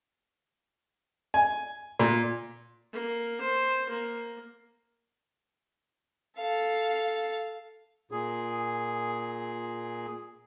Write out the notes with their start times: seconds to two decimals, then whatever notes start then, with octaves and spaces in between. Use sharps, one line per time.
1.34 G#5
2.00 A#2
2.93 A#3
3.41 C5
3.90 A#3
6.38 A4 F5
8.11 A#2 G#4